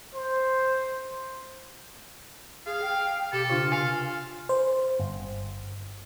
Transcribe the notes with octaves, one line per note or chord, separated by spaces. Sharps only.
C5
G#4 F5
G5
B2 G4 A4
C#3 D4 F4
C3 F5 G#5
C5
G1